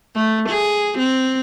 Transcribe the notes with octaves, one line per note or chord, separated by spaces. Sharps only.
A3
G#4
C4